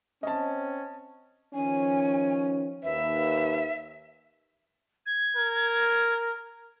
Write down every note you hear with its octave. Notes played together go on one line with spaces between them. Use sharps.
C4 C#4 D#5 A5
D#3 F3 C#4 G#5
D#2 B4 E5
G#6
A#4